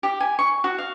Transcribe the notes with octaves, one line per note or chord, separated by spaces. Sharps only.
G4
G#5
C#6
F#4
F5